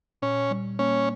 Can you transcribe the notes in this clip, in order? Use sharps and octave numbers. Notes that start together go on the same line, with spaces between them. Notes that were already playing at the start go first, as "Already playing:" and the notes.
A#2 C#4
G3
A#3 C#4